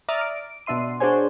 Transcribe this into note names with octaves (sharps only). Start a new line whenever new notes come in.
D5 E5 A#5 D#6 F6 A6
D7
B2 D4 E5 C6 D#7
D4 F#4 G#4 C5 C#5 G#5